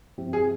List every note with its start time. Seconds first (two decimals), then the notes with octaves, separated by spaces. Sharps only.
0.18 G2 F3 C4 E4 G4
0.33 G#4